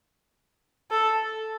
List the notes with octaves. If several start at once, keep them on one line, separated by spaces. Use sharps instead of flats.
A4